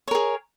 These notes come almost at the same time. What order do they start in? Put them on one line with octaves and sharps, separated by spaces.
C#5 A#4 G#4